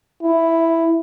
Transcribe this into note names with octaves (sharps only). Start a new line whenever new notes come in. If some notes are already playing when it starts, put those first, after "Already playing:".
E4